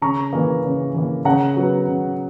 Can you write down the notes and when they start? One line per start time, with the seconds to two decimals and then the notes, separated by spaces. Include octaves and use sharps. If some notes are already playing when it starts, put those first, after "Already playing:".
0.02 C#3 A#5 C#6
0.33 E3 A#3
0.64 C#3
0.94 E3 A#3
1.25 C#3 F#5 A#5
1.57 F#3 B3
1.88 C#3